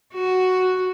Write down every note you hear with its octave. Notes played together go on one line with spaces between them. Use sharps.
F#4